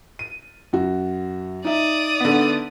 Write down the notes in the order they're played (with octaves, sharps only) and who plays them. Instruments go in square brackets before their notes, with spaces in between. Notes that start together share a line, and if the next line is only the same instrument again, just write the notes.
[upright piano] D#7
[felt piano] F#2 F#4
[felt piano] D#4 E5 [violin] D5 D#6
[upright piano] D3 B3